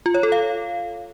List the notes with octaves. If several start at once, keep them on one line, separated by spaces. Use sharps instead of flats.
F4
C#5
A4
F5